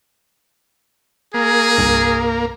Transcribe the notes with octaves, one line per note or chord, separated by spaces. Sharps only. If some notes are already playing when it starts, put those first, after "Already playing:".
A#3 G#4
G1 C2 G2